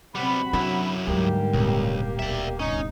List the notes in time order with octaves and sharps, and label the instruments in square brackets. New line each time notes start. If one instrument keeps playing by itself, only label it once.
[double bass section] C3 F#3 C4 [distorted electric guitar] G3 B3 [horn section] F#4 F#5 B5
[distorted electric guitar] F#2 E4 [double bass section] F#3 [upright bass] D4
[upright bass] D2 F#3 [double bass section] G#2 D3 G3 [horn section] A#3 G4
[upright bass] D1 A#2 [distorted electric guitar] C#2
[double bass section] B1 [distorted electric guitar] D5 E5
[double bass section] G1 C2 [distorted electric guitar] C#4 [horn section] D#4